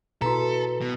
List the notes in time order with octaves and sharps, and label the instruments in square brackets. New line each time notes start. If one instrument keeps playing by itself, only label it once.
[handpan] B2 E4 [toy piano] F#4 A#5 [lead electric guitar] A4 [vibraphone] B4
[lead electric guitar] B2